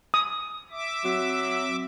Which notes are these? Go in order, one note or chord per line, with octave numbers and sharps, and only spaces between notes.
D#6
E5 D6
F#3 C4